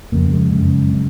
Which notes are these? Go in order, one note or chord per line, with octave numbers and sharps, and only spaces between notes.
F2 C#3 A#3
G#3
F#2 C#3
C#3